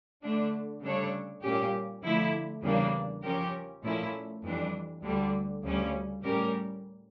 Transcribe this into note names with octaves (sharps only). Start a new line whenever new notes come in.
D3 A3 D4
C#3 G3 D4 A4 C#5
A#2 G3 C#4 G4
D3 F3 A3 E4
E2 C#3 G3 A#3 D4
F3 C#4 G4 A#4
A#2 F3 A3 C#4 E4
F2 E3 G3 D4
D2 D3 G3
D2 C#3 G3 C#4
A2 G3 C#4 G4 A#4